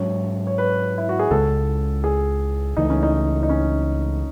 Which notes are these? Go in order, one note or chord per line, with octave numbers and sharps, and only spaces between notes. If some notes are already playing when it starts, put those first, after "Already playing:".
Already playing: G#2 F#3 C#4 C#5
C#5
B4
E4
F#4
G#4
C#2 C#3 G#3 A4
G#4
C#2 C#3 E3 A3 D#4
C#4
D#4
D#4
C#4